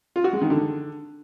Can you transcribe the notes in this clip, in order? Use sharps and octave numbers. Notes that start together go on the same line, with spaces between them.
F4
F#4
G#3
D#3
D3